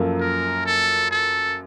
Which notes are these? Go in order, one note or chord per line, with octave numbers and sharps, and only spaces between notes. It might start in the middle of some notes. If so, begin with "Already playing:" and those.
Already playing: F#2 F3 A#3 F4 A4
A#4
A4
A4